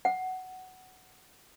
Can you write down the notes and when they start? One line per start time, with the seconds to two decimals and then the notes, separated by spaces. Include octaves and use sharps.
0.05 F#5